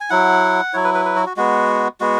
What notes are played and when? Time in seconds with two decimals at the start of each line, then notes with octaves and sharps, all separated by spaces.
0.01 G#5
0.10 F#3 E4 F#5
0.73 F#3 E4 C#5
0.84 B4
0.94 B4
1.05 B4
1.16 F#4
1.26 F#4
1.37 G#3 B3 F#4
2.01 G#3 B3 F#4